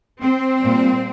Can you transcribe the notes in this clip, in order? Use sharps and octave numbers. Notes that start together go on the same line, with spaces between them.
C4
A#2 G3